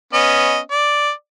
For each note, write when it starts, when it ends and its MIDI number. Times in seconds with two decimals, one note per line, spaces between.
0.13 0.59 59
0.13 0.59 61
0.13 0.59 75
0.71 1.11 74